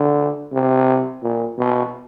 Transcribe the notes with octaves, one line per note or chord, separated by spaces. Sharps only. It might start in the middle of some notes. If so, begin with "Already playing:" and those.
Already playing: D3
C3
A#2
B2